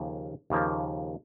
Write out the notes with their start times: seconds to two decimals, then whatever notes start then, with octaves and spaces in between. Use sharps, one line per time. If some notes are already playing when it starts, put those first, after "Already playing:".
Already playing: D#2 C#3 F3 A#3
0.50 D#2 C#3 F3 A#3